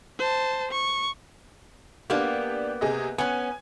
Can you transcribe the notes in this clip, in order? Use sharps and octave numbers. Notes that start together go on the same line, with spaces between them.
C5 A5
C#6
A#3 B3 D4 G4
C3 G#4 D#5
B3 C#4 G#5